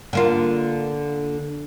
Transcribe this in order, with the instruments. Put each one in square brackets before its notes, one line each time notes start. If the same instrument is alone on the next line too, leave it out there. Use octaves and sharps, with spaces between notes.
[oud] D3 A#3 F4